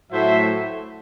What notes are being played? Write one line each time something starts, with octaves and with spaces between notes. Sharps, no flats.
A2 F#3 A3 C5 E5